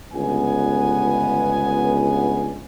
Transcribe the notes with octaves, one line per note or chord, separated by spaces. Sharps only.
G1 C#2 B3 G#5